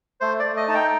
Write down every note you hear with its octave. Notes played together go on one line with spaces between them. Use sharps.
A3 C5
A3 D5
D#5
D#4 A5
G5